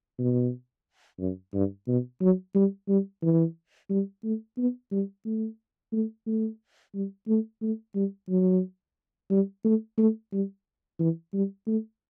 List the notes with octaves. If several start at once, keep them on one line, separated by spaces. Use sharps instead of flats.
B2
F#2
G2
B2
F#3
G3
G3
E3
G3
A3
B3
G3
A3
A3
A3
G3
A3
A3
G3
F#3
G3
A3
A3
G3
E3
G3
A3